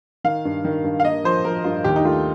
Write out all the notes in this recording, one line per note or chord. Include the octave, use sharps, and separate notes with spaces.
D#3 F5
G2
D#3
G2
F5
A#3 D#5
F3 C5
F3 A#4
G2 F4
D#2 G4
D#4
A3 F4